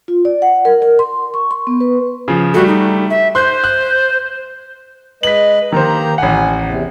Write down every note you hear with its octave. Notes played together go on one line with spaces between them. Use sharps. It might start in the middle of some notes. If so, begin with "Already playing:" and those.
F4
D5
F#5
A#4
A#4
C6
C#6
C6
B3
B4
C#3 F3
G3 A3 F#4
D#4
E5
C5 C6 F#6 G6
F#6
G#3 B4 D#5 B6 F#7
D#3 A#3 G4 C5 A#5
A1 F#5 G#5
E2 C3